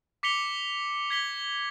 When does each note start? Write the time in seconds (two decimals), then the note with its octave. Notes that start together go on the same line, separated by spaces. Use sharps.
0.23 D6 B6 C#7 F7 G7
1.10 G#6 B6 G7